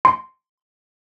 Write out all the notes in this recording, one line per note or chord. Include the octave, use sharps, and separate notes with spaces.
C6